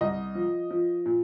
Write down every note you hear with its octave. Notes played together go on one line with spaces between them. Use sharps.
C2 D#5
F3
F3
A#2